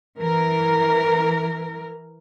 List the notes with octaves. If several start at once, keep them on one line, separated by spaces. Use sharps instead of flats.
E3 A#4